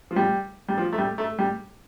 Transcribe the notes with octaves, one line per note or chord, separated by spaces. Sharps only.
F3
G3
G3
F3
A3
G3
A3
G3